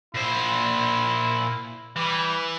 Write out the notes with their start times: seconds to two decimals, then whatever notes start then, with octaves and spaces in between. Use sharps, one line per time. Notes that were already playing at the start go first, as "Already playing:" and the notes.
0.14 A#2 E4 C5
1.96 E3 G3